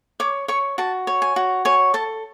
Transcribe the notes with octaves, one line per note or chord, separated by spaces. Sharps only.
C#5 D6
C#5 C#6
F#4 A5
C#5
G#5
F#4
C#5 G#5
A4 A5